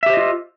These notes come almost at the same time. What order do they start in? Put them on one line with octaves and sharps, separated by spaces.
E5 G4 C5 D#5 F4